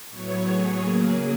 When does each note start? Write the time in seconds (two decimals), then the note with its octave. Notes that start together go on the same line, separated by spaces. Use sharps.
0.11 A2 F#3 B3 C#5
0.45 G#4
0.80 C#3 F#3 A#3